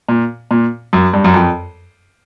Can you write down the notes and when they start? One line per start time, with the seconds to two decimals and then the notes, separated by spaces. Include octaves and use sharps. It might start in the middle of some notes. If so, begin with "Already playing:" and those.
0.09 A#2
0.51 A#2
0.93 F#2
1.13 G2
1.24 F#2
1.34 F2